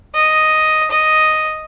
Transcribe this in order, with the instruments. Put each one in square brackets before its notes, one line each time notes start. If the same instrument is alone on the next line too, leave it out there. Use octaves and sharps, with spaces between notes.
[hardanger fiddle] D#5
D#5